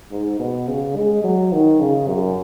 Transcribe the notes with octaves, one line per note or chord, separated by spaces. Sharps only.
G#2
B2
C#3
G#3
F#3
D#3
C#3
F#2